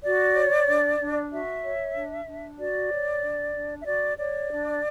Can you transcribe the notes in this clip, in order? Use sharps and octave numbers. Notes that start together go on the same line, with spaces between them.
F#4 D5
C#5
D4
D4
F#4 E5
C#5
D4
D4
F#4 D5
C#5
D4
D4
E5
F#4 D5
C#5 D5
D4